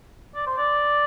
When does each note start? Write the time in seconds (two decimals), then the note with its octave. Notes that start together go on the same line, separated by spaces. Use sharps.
0.35 D5
0.46 C5
0.57 D5